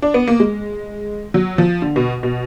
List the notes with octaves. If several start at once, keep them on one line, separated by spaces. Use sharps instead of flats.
D4
B3
A#3
G#3
F#3
F3
D3
B2
B2